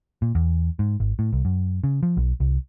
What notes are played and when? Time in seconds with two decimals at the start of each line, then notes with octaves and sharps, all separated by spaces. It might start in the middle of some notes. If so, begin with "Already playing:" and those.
0.22 A#2
0.35 E2
0.79 G#2
1.00 G#1
1.19 A2
1.33 C2
1.45 F#2
1.84 C#3
2.03 F3
2.17 B1
2.40 C2